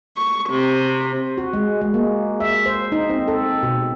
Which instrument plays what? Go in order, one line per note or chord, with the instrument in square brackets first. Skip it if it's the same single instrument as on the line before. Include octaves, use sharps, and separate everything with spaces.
[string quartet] C#6
C3
[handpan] F#4
G#3
G#3
A#3
E5
C5
D#4
C4
A4
B2